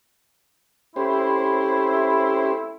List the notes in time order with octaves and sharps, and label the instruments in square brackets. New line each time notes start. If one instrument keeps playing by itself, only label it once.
[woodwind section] A3 C4 E4 [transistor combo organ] C#4 G4 C5 [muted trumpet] B5